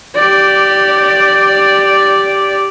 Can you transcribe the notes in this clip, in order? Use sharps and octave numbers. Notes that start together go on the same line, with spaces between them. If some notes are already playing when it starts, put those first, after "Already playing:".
G4 D5